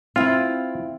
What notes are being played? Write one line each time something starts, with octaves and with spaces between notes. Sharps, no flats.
C4 E4 F4